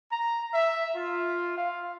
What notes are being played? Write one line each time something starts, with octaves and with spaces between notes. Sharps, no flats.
A#5
E5
F4
F5